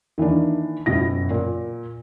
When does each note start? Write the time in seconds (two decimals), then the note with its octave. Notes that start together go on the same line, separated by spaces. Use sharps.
0.18 D#3 E3 A#3 D4
0.86 F#1 B2 E4 A#6
1.31 A#2